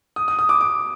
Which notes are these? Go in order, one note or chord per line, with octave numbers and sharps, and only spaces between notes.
D#6
D#6
D#6
D6
D6